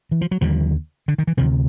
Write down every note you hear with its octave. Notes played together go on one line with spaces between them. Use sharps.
E3
F3
F#3
D#2 D3 F3 G3
D3
D#3
E3
D2 C3 D#3 F3